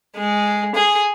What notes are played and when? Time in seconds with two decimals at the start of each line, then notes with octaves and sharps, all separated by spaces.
0.16 G#3
0.75 G#4